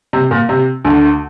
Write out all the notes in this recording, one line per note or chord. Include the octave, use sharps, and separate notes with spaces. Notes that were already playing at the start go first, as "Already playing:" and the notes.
C3
A#2
C3
D2 D3